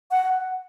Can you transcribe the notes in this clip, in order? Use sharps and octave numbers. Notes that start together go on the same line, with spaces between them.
F#5